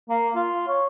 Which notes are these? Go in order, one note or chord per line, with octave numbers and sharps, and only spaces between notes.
A#3
F4
C#5